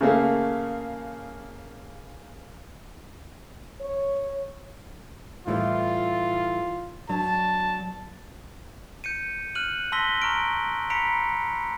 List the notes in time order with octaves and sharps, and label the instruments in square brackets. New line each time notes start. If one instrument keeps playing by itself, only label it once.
[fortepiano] C#3 A3 A#3
[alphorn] C#5
[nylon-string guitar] A2 E3 G3 [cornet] F4
[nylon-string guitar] F#3 D4 [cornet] A5
[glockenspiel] G6 C#7 D#7
F6 F#6 D#7 F#7
A5 C6 E6 A#6 B6 G7
A#5 C#6 F6 D7
A#5 B5 B6 C#7 D7 F7